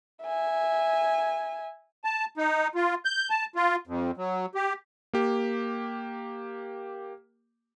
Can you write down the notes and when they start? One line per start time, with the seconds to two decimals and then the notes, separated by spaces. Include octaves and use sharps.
0.24 E5 G#5
2.04 A5
2.37 D#4
2.75 F4
3.05 G6
3.30 A5
3.56 F4
3.87 F2
4.17 F#3
4.55 G4
5.13 A#3 G4